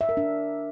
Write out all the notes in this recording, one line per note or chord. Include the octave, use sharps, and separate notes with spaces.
E5
A#4
D4